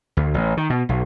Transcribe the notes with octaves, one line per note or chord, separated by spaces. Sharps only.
D2
A1
D#3
B2
B1